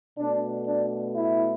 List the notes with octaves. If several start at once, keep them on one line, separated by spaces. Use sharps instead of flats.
B2 A3 D4
D4
E4